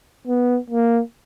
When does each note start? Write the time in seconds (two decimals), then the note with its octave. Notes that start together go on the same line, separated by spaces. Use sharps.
0.27 B3
0.70 A#3